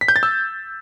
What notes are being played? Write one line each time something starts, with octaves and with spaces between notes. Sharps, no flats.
B6
G6
A6
E6